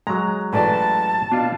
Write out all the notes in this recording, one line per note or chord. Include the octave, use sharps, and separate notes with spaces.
F#3 G#3 A#5
A1 E3 D5 A5
B2 D4 F4